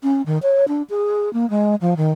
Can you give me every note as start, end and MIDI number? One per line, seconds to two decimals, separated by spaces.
0.03 0.22 61
0.26 0.38 51
0.43 0.65 73
0.68 0.82 62
0.90 1.32 68
1.33 1.48 58
1.50 1.75 56
1.81 1.95 53
1.97 2.12 51